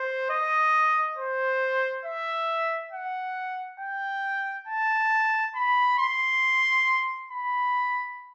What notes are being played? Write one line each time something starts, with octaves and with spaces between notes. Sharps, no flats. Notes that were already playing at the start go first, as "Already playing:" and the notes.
Already playing: C5
D#5
C5
E5
F#5
G5
A5
B5
C6
B5